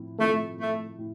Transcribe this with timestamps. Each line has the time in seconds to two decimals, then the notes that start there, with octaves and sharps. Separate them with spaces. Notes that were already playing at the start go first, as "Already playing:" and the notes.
Already playing: A2 F3 C4 E4
0.19 A2 F3 A3 C4 E4
0.59 A3
0.98 A2